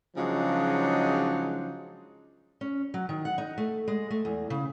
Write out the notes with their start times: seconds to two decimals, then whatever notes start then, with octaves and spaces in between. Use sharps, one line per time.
0.17 C#3 F3 F#3 G#3 D4 D#4
2.61 C#4
2.94 F#3
3.09 D#3
3.25 F#5
3.38 D#4
3.58 A3
3.88 G#3
4.10 A3
4.25 E2
4.50 C#3